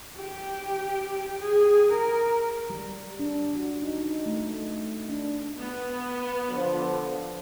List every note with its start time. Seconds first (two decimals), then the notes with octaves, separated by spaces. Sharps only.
0.17 G4
1.41 G#4
1.90 A#4
2.70 G3
3.19 D4
3.56 F#4
3.82 D#4
4.26 A3
5.09 D4
5.56 B3
6.49 D3 F3